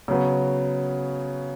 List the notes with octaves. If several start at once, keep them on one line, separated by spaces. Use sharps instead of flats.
C#3 F#3 B3